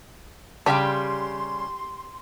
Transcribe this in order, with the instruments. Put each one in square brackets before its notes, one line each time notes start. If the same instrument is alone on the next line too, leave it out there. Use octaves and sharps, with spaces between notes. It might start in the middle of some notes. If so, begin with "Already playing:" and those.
[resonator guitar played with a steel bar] C#3 G3 [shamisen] D4 [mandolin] G4 G5 B5 [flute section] C6